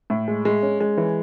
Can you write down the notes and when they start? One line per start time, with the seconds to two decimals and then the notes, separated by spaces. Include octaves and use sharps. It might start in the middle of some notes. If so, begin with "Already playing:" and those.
0.10 A2
0.28 G#3
0.45 G#3
0.62 C#4
0.80 G#3
0.97 E3